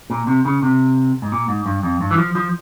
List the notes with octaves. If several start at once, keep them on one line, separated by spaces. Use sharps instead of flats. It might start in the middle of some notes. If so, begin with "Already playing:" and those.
A#2
C3
C#3
C3
G#2
A#2
G#2
G2
F2
G2
E3
F3
F3